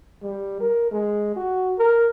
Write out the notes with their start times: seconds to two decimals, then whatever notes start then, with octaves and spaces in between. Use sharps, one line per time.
0.22 G3
0.60 A#4
0.91 G#3
1.36 F#4
1.78 A#4